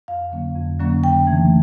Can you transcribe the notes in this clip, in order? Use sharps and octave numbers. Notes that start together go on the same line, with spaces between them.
F2 F5
D3 F#3 A#3 C#4
F2
D3 F#3 A#3 C#4
C#3 G5
E3 A3 D4